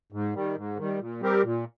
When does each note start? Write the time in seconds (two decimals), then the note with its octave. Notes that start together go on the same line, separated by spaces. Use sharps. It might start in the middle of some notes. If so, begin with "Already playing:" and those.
0.12 G#2
0.34 D#3 G3
0.56 G#2
0.77 D#3 G3
1.00 A#2
1.21 G3 C4 G4 A#4
1.43 A#2